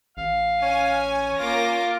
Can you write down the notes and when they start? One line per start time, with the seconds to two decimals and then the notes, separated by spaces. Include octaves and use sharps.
0.17 A1 F5
0.62 C#4 G#5
1.38 A#3 F4 D6 A#6